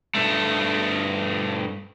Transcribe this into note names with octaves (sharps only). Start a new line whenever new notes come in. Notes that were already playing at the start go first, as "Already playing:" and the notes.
G2 A3